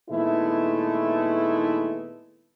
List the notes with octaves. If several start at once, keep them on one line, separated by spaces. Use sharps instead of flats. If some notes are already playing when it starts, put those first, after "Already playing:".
A#2 D#3 G#3 A3 B3 E4